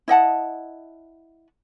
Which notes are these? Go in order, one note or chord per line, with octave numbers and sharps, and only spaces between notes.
E4 D#5 F#5 A5